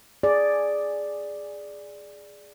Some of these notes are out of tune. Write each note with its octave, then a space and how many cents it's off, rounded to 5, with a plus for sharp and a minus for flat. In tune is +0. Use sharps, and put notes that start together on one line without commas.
G#4 +0 D5 +0